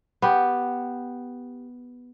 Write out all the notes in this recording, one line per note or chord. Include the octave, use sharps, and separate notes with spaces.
B3 G4